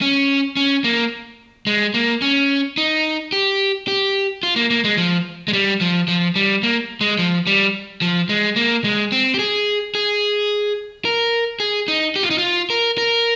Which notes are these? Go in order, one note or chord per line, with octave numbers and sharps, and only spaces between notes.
C#4
C#4
A#3
G#3
A#3
C#4
D#4
G4
G4
F4
A#3
A#3
G#3
F3
G#3
G3
F3
F3
G3
A#3
G#3
F3
G3
F3
G#3
A#3
G#3
C4
G4
G#4
G#4
A#4
G#4
D#4
G4
F4
D#4
F4
A#4
A#4